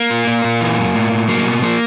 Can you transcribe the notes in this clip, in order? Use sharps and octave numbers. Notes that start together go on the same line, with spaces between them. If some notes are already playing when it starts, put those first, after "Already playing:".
Already playing: A#3
A#2
A#2
A#2
E3
F#2
A2
A2
F#3 A#3
B2
F3 A#3